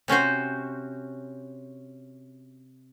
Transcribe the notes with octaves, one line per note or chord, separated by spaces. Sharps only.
C3 C#4 F#4 C5